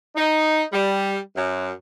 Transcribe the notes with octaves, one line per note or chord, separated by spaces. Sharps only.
D#4
G3
F#2